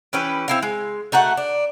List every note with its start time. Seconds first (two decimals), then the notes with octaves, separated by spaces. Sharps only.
0.13 E3 C#4 G4 B4
0.48 C4 E4 F5
0.62 G#3
1.12 A3 D#4 F#4 F#5
1.37 D4